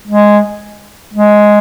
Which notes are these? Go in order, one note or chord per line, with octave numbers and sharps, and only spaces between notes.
G#3
G#3